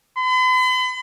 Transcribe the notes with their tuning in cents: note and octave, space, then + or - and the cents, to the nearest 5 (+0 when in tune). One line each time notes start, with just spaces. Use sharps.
B5 +45